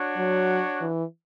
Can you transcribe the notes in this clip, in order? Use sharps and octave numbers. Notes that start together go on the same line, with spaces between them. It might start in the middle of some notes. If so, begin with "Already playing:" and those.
Already playing: D4 F#4 C#5
F#3
E3